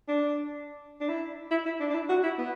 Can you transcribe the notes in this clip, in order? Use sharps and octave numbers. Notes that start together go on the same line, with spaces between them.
D4
D4
E4
E4
E4
D4
D4
E4
F#4
E4
B3